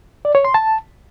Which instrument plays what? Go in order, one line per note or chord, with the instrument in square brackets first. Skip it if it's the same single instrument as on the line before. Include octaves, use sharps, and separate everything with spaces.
[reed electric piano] D5
C#5
C6
A5